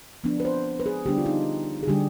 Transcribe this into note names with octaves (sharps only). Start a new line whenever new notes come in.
F3 B3 D4
B4
C5
B4
G#4
D3 G3 B3 D4 G4
F4
D#4
G#4
D3 G3 D4 G4